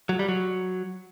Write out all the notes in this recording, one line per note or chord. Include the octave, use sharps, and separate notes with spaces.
F#3
G3
F#3